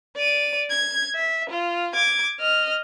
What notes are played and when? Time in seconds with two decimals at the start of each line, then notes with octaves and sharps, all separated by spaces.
0.16 D5 D#7
0.70 G#6
1.15 E5
1.50 F4
1.94 D6 G#6
2.40 D#5 F6